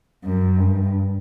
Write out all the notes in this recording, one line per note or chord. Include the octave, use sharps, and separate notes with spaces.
F#2
G2